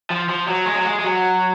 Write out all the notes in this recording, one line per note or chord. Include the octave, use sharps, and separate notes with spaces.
F3
F3
F#3
G#3
F#3
G#3
G#3
F#3